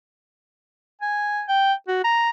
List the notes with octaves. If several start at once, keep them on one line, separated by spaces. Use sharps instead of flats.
G#5
G5
F#4
A#5